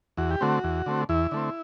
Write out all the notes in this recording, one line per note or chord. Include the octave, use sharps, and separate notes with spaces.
E2 F#4
G4
D3 A3 C4 F#4
E2
D3 A3 C4
E2 E4
D3 A3 C4